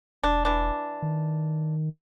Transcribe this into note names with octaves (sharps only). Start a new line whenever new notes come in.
E1 D4
E3 D4
D#3